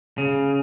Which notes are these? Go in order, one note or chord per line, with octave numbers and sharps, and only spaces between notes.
C#3